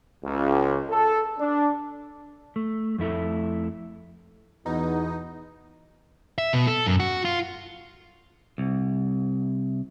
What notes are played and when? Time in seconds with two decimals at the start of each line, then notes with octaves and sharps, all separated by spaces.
0.25 C#2
0.90 A4
1.39 D4
2.56 A3
2.98 F2 A3 E4 A4
4.66 E2 B2 B3 D#4
6.38 E5
6.53 B2
6.67 A4
6.86 F#2
7.00 F#4
7.25 F4
8.58 C2